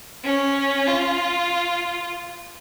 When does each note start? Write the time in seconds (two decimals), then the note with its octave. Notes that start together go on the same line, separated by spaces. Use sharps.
0.25 C#4
0.87 F4